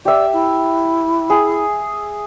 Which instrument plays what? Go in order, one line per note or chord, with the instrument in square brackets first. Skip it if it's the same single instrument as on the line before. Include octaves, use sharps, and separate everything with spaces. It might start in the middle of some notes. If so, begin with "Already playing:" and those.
[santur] G4 E5 [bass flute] D5
[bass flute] E4
[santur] G#4